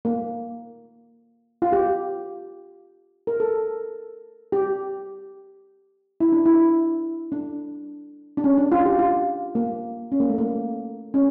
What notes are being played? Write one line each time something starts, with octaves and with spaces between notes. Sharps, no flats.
A#3
F4
G4
A#4
A4
G4
E4
D4
E4
D4
D4
C#4
D4
F4
G4
F4
A#3
C#4
A#3
A3
A#3
C#4